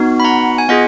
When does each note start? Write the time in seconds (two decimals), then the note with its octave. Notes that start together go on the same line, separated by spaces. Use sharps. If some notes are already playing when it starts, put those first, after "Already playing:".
Already playing: B3 D#4 F#4
0.20 B5
0.24 F#5 A#5
0.58 G#5
0.69 B3 F4 G#4 D#5 F#5